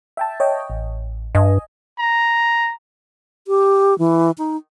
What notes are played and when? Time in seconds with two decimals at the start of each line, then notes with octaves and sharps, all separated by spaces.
0.17 E5 G5 A5
0.40 C#5 D#5 G5
0.70 A1
1.35 G2 D#5 G#5
1.99 A#5
3.47 G4
3.99 E3
4.38 D#4